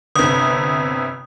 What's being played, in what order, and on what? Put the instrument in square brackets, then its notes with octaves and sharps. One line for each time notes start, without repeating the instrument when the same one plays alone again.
[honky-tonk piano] G1 C3 [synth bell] D#6